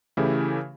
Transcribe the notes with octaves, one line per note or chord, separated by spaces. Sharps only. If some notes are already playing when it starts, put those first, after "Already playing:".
C#3 E3 A3 E4 G4